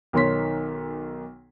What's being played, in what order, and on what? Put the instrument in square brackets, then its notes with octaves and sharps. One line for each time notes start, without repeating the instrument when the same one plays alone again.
[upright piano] B1 D#3 C#5 C6 B6